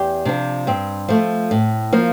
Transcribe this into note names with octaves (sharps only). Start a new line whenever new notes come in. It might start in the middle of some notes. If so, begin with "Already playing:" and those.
Already playing: E2 G4
C3 F3 D4
G2 C4
F3 A3
A2
F3 A#3